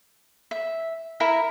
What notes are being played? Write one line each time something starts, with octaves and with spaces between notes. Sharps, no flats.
E5
E4 A#4 E5